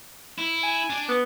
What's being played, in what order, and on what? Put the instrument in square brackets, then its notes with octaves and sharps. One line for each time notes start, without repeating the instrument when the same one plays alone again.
[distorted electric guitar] E4
[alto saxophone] G#5
[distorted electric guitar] D4 D5
[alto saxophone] B3